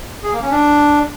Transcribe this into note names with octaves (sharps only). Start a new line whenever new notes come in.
G#4
A#3
C#4
D4